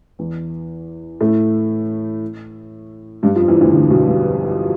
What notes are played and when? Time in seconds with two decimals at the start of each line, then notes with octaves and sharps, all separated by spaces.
0.19 E2 E3
1.21 A2 A3
3.23 G2 G3
3.36 F2 F3
3.48 E2 E3
3.61 D2 D3
3.74 D2 D3
3.90 B1 B2
4.07 G2